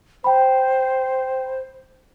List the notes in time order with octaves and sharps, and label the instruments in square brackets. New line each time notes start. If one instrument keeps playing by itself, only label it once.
[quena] C5 [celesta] G5 B5